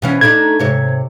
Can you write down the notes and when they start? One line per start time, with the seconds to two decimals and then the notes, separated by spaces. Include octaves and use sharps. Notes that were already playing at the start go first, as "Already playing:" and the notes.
0.02 B2 E3 C#4
0.21 A3 D4 D#4 G#6
0.59 G#2 C3 C#5